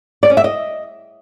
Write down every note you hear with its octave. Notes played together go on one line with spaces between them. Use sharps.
D5
C#4
E5
D#5